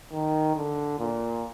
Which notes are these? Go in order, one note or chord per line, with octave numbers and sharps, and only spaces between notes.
D#3
D3
A#2